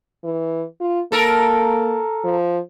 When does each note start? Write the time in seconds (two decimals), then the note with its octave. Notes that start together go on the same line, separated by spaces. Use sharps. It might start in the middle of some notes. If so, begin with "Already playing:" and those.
0.24 E3
0.80 F4
1.12 A#3 A4 A#4
2.24 F3